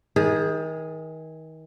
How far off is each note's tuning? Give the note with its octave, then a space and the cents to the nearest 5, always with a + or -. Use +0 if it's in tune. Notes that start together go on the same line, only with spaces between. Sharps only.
D#3 +35 G#4 +0